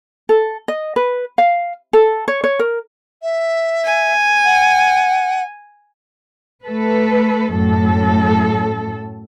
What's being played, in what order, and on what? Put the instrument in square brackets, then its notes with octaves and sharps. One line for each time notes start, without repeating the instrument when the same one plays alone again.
[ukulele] A4
D#5
B4
F5
A4
C#5
C#5
A#4
[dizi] E5
[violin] G#5
[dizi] F#5
[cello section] A3 A4 B4
F#2 A2 A4